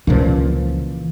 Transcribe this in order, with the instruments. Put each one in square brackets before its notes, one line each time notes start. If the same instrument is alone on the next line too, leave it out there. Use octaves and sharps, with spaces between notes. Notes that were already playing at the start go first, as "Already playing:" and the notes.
[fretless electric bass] C#2 A#2 F3 [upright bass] C#3 E3